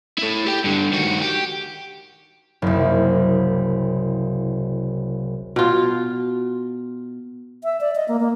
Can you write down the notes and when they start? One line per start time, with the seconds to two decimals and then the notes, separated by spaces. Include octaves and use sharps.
0.18 E4 A4
0.46 G4 G5
0.64 G2 D3
0.93 D#3 F#4
1.22 G4
2.62 F#1 C2
5.56 B2 F4
7.64 E5
7.81 D5
7.95 D#5
8.08 A#3
8.20 A#3